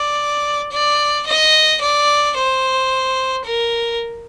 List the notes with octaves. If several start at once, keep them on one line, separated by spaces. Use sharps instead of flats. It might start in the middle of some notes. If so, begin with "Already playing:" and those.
Already playing: D5
D5
D#5
D5
C5
A#4